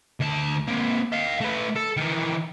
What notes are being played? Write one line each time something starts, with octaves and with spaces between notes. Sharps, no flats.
D2 A5
A#3 C4
D#5 F5
A3 B4
A4
D#3 E3